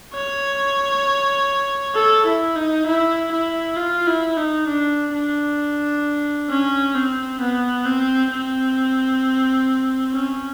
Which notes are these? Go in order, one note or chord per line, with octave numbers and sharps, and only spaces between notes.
C#5
A4
E4
D#4
E4
E4
F4
E4
D#4
D4
D4
C#4
C4
B3
C4
C4
C#4